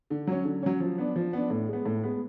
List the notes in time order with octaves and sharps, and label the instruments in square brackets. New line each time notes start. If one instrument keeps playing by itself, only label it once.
[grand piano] D3
F#3 C#4
D3
F#3 C#4
F3
B3 D4
F3
B3 D4
A2
G#3 B3
A2
G#3 B3